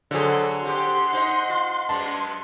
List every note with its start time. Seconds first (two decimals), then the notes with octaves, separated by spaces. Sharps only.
0.11 D3 F#3 C4 G#4 A4 C5
0.65 C4 G4 F#5 C6
1.12 D#4 C5 D#5
1.50 F4
1.89 F#2 G#3 B3 A5